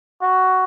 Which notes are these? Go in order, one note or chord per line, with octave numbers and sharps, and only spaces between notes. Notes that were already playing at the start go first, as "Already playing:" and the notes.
F#4